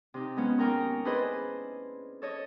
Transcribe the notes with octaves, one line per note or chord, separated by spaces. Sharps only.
C3 D#4
G#3 B3 C#4
D#2 D#4 A#4 G5 A#5 C#6
D4 E4 G#4 B4 C5 D#5
A4 C#5 D#5